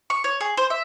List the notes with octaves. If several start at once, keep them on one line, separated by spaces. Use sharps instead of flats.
C#6
C#5
G#4
C5
E5